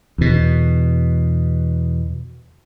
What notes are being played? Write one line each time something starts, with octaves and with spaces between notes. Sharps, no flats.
E2 B2